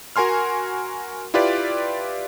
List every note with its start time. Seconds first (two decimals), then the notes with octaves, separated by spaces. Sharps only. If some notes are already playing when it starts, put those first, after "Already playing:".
0.16 F#4 A#4 G#5 C6 F6
1.34 E4 F4 G4 B4 D5